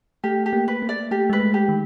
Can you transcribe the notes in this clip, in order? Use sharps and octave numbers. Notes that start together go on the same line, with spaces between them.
A3 G4
G4
A#3
B4
A#3
D5
A3 G4
G#3 B4
A3
G4
D#3